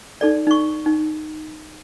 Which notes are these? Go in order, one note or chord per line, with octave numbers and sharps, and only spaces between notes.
D#4 A4 D5
D#4 C#6
D#4